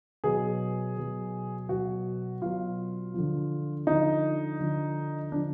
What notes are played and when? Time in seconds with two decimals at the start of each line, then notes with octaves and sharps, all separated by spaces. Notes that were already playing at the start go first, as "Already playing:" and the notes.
0.24 B2 F#3 G#4
0.97 B2 F#3
1.69 B2 F#3 F#4
2.42 B2 F#3 F4
3.14 D3 F3
3.87 D3 F3 D#4
4.59 D3 F3
5.32 D3 F3 D4